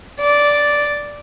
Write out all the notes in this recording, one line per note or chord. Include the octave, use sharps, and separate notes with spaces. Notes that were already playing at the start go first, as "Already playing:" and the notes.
D5